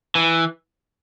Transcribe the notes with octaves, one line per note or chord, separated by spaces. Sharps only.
E3